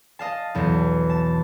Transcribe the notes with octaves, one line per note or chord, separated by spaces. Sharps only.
D#5 F5 A5
B1 E2
A5